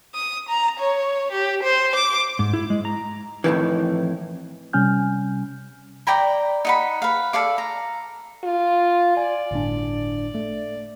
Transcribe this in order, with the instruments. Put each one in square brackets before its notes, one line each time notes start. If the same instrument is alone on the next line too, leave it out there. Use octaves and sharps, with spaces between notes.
[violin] D#6
A#5
C#5
G4
C5
D6
[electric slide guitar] G#2
E4
G#3
A#5
[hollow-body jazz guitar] F2 A2 C3 D#3 E3
[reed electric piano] C3 G3 C#4 G#5 F6 G6
[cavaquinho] D5 G5 A#5 B5
D#4 F#5 B5
B4 F5
A4 D5 F5 D6
A#5
[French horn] F4
[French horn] D5 [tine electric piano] G#5
[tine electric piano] G1 A2 D4
A3